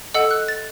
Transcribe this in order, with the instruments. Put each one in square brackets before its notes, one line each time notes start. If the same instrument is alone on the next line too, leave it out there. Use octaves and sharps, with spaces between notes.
[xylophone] A4 D#5 F#5 E6
F#6
A6